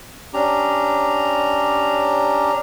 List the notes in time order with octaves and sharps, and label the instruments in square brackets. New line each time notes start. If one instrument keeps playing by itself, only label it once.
[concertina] C#4 D4 G4 A#5